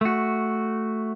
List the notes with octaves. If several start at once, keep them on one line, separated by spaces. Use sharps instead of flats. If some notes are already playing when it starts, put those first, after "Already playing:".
A3 F#4